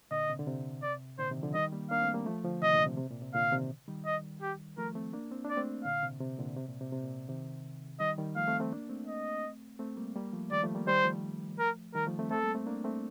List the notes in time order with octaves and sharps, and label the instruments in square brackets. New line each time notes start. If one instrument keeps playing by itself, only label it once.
[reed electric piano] A#2 D3 [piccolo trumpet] D#5
[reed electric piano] C3
D3
C3
[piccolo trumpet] D5
[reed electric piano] A#2 D3 [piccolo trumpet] C5
[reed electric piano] C3 D#3
D3 F3
[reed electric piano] D#3 G3 [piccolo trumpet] D#5
[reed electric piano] G3 A#3
[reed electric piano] A#3 D4 [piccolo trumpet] F5
[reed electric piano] A3 C4
G3 A#3
F3 A3
D3 F3
[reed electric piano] C3 D#3 [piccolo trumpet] D#5
[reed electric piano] A#2 D3
C3
C3
A#2
C3
[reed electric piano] A#2 D3 [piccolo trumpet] F5
[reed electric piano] C3 D#3
D#3 G3
[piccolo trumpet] D#5
G4
[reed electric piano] F3 A3 [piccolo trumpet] A#4
[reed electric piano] A3 C4
A#3 D4
C4
[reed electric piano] D4 [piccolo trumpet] D5
[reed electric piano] A3 C4
[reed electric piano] A#2 D3 [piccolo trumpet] F5
[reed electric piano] C3
C3
A#2 D3
C3
A#2
C3
C3
A#2
C3 D#3
[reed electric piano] D#3 G3 [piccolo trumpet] D#5
[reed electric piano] D#3 G3
[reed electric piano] F3 A3 [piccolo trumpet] F5
[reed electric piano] A3 C4
A3 C4
A#3 D4
A3 C4
[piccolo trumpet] D#5
[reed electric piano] A3 C4
G3 A#3
G3 A#3
F3 A3
[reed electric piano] D#3 G3 [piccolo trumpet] D5
[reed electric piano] F3 A3
G3 A#3
[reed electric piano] D#3 G3 [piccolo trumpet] C5
[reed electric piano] F3 A3
[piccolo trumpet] A#4
[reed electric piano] D#3 G3 [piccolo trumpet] A#4
[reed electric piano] F3 A3
A3 C4
[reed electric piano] A3 C4 [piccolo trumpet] A4
[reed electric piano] G3 A#3
A3 C4
A#3 D4
A3 C4